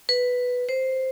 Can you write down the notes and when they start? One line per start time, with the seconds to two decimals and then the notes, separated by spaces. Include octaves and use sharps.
0.09 B4
0.69 C5